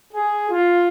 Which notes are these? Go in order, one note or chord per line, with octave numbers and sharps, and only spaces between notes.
G#4
F4